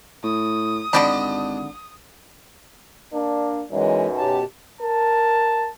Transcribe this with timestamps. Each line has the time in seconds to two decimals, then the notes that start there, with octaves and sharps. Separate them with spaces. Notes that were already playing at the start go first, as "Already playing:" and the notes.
0.24 A2 D#6
0.93 G#1 D3 D4 D5 D#5 G5 B5
3.13 A#3 D4
3.71 B1 F#2 E3 G#3
4.18 B2 G4 A5
4.81 A#4 A5